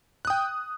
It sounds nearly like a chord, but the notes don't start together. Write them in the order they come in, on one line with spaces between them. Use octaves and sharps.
F#6 D#6 G5